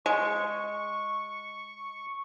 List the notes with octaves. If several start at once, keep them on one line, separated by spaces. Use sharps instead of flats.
G#3 C#6